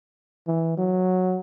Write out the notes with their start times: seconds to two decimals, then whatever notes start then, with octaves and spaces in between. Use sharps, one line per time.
0.47 E3
0.77 F#3